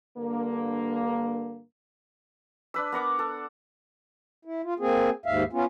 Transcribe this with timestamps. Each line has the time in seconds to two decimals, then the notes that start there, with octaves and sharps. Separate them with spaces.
0.18 G2 D3 A#3
2.74 D4 B4 E6
2.92 B3 A#4 F#5 D6
3.19 A4
4.45 E4
4.64 F4
4.80 A#3 C4 G#4
5.26 D#2 G#2 E5 F5
5.53 B3 C#4 F4